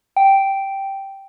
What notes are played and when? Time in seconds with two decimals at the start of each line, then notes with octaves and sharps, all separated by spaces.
0.16 G5